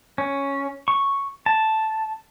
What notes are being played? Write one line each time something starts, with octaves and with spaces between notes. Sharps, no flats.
C#4
C#6
A5